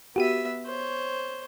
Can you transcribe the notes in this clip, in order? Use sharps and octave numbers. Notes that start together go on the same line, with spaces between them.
B3 F#4 G4 E5 D#7
C5 C#5